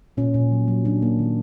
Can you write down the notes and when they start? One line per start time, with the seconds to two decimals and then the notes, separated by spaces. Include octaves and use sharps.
0.17 A#2 C#4
0.34 A#2
0.52 F#3
0.68 F#3
0.85 F#3 D4
1.02 A#3
1.19 D#3